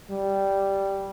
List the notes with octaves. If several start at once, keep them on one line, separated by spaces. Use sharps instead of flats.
G3